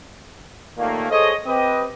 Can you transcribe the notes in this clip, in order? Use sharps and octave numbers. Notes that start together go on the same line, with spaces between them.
D#2 A#2 D#3 A3 A#3
G#4 A4 C5 C#5 D#5
C4 G4 B4 D#5